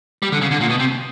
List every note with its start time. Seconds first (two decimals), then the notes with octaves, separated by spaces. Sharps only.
0.22 G3
0.32 D3
0.41 C#3
0.51 D3
0.60 A#2
0.70 B2
0.79 C3